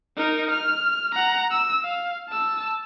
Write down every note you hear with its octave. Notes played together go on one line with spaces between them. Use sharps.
D#4 A#4
F6
F#5 A#5
E6
F5
A5 E6